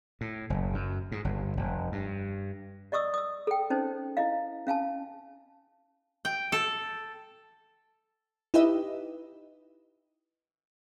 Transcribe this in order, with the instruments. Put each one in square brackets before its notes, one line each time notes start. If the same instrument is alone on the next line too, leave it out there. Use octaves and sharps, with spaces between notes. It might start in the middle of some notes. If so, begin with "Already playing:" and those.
[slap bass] A2
F#1
F#2
G#2
G1
F1
G2
[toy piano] D5 D#5 C#6 D#6 E6
D#6 E6
A4 G5
C#4 D#4 C5
E4 D#5 F5
C#4 F5 G#5 A5
[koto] G5
A4
[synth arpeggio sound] D#4 E4 G4 B4 D#5 E5